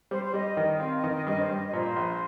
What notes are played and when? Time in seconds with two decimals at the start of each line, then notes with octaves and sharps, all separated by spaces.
0.11 G3 C5
0.23 C5
0.34 G3 D#5
0.57 D#3
0.80 C4 F5
0.96 D#5
1.04 D#3
1.11 D#5
1.27 G2 D#5
1.38 C5
1.50 G2 D#5
1.67 D#5
1.73 A#2 C5
1.96 A#1